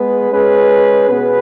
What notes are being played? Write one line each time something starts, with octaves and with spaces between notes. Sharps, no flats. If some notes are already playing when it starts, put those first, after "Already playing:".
Already playing: G#3 B3 G#4 B4
G#3 C#4 G#4 B4
B2 B3 G#4 B4